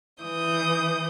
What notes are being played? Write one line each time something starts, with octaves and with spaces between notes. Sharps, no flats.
E3 D#6 G6